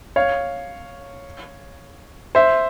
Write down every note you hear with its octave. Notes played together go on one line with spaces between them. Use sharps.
C#5 F5
C5 E5